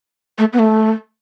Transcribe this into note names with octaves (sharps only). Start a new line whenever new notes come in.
A3
B3
A3